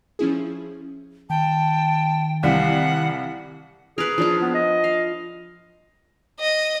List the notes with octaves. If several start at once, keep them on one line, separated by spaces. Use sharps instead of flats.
F3 C#4 E4 G#4
D#3 G5 A5
C2 E3 G3 F5 F#5
G#4 A#4 B4
F3 D4 F4
B3
D#5
F5
D#5